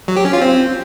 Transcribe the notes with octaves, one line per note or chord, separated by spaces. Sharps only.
F#3
G4
C#4
F4
C4